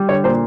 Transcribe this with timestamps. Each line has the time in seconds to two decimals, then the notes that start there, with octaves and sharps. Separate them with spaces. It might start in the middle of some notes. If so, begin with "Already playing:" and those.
Already playing: G3
0.09 D3 C#5
0.24 A#2 C5